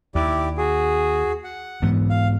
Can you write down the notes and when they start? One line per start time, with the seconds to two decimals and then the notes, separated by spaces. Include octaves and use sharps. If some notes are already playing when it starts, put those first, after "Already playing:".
0.15 D#2 E4 G4 D5
0.58 F#4 G#4
1.44 F#5
1.82 G#2 E3 B3
2.10 F5